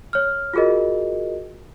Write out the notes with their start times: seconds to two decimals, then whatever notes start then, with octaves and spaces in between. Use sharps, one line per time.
0.13 C#5 F6
0.54 F4 F#4 G#4 A#4 D#5